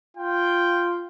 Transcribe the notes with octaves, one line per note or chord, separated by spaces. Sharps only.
F4 G5